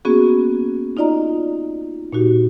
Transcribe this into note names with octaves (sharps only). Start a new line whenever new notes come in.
A#3 B3 C#4 F#4 G#4
D#4 F4 D5 D#5 A#5
A#2 D#4 F#4 G4